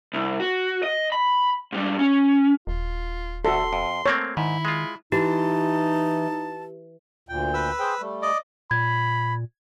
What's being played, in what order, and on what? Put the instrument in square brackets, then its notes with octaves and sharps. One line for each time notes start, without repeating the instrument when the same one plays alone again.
[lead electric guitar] C2
F#4
D#5
B5
G#2 G3
C#4
[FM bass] D#1 [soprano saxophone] F4
[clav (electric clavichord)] D2 [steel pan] F#4 A4 [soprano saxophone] C6
[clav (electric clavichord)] F2
[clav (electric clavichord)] A3 A#3 C4 [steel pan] C#5
[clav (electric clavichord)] G#2 [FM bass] D#3 [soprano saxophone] E4
[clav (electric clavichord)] G#3 F4
[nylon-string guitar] E3 [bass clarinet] D#4 [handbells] G4 [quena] A5
[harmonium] D2 A#2 G5
[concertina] B4 E6
[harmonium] G#4 C5 G5
G3 A3
[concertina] D5 D#5
[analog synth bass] A#2 [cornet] B5 [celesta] G#6